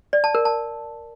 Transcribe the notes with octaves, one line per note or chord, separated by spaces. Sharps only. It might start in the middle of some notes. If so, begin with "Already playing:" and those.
D5
A5
A#4
A5